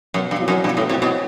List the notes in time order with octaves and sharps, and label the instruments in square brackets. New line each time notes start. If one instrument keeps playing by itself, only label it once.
[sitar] F#2 [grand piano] B2
[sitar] G2
[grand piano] F#3 C4 E4
[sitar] F#2
[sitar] G2 [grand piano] B2
[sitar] A2
[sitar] C3 [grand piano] F#3 C4 E4
[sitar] B2